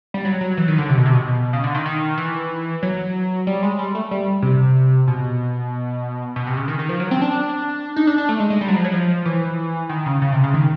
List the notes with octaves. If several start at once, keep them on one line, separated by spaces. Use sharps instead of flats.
G3
F#3
F#3
E3
D#3
D3
C3
B2
C3
B2
C#3
D3
D#3
D#3
E3
F#3
G3
G#3
G3
A3
G3
C3
B2
B2
C3
C#3
D#3
D#3
F3
F#3
C4
D4
D#4
D4
D4
A3
G#3
G#3
G3
F#3
F3
F#3
F3
E3
D#3
C#3
C#3
C3
C#3
D#3